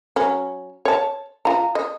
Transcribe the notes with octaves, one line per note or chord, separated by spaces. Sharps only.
F#3 C#4
C#5 A5
F4 A#5
D#5